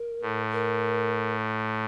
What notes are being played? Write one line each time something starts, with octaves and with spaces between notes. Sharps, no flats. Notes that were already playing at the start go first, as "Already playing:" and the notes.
Already playing: A#4
A2
A#4